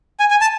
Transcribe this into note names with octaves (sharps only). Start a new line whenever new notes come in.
G#5
G#5
A5